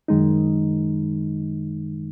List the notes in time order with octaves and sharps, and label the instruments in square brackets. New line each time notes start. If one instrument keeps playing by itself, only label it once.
[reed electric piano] F#2 D#3 G#3 D#4